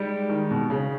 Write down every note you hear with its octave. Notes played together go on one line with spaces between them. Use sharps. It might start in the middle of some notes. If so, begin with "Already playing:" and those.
Already playing: G3 G#3 D#4 G4
D#3
B2
C#3